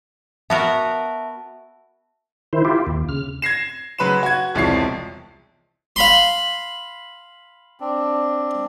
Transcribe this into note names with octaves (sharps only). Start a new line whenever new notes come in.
B3 F#4 A#4 E5 A5
D#3 E4 C5
E4 F4 G4
D#2
C#3 F6
G#6 A#6 C7 E7
C#3 F#3 B4 B5 C6 E7
F#4 G#6
E1 C2 F3 C#5 A5 C7
F5 B5 C6
C4 D4